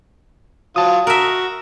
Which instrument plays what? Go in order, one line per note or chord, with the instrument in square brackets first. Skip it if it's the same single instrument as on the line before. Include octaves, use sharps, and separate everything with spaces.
[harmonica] F#3 F4 [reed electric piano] A5 D#6
[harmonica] F#4 [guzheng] A#4 E5